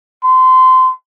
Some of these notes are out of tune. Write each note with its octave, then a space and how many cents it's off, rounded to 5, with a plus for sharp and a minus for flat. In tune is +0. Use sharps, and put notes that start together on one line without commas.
C6 -25